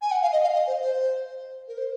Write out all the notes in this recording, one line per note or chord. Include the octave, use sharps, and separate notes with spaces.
G#5
F#5
F5
D#5
F5
D#5
C5
C5
A#4
C5